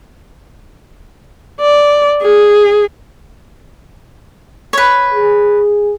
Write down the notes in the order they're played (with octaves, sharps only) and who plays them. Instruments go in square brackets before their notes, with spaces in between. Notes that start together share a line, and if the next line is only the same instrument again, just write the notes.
[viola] D5
G#4
[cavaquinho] B4 C#5
[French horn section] G#4